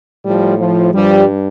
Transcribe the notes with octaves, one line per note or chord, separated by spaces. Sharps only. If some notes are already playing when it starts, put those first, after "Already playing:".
A2 F3 G3
F3
G2 F3 G3